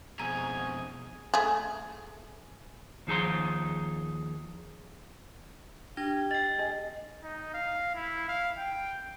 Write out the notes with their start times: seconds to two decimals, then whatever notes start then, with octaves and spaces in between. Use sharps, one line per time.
0.20 F2 B2 G#4 G#5 A#5
1.34 A3 G#4
3.07 D#2 F3 D#4 G#4 A#5 C6
5.97 D4 G4 G#6 A#6
6.31 D#5 G5 A6
6.59 G#4 D#5
7.23 D#4
7.54 F5
7.95 E4
8.28 F5
8.58 G5